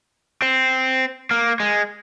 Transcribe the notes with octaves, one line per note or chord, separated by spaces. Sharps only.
C4
A#3
G#3